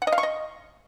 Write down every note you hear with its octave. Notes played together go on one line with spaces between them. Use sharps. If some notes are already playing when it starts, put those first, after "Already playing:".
F#5
D#5
F5
C#6
D#5